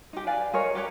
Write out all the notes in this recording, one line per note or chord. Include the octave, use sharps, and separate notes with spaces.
D#4 G4
B4 D5 F5 G#5
G#4 A#4 C#5 D#5
G4 B4 C#5 A#5